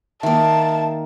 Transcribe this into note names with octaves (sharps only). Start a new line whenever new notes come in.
D#3 A#3 E5 A5